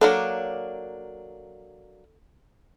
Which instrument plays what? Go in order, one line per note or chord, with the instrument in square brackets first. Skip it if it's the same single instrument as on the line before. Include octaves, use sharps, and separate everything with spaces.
[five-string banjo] F#3 A#3 D4 [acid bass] A4